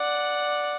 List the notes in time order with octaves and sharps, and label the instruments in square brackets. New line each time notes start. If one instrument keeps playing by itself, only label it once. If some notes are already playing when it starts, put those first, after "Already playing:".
Already playing: [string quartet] D5 F#5